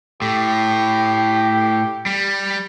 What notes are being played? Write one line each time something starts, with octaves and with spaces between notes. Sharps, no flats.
A2 G4
G3